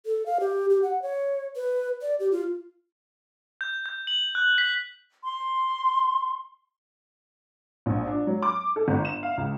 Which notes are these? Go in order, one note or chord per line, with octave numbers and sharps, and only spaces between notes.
A4
F5
G4
G4
F#5
C#5
B4
D5
G4
F4
G6
G6
F#7
F#6
B6
C6
A#1
D4
F#3
D6
A4
G1
E7
F5
C#2